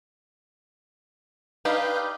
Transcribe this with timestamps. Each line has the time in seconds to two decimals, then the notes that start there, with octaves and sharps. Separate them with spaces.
1.65 D4 D#4 G4 B4 F5 G6